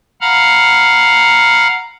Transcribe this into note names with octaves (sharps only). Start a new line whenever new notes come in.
F5 F#5 A#5 B5 F6